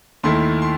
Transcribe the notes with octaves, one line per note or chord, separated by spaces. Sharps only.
D#2 D#3 A3 E4 C6
C6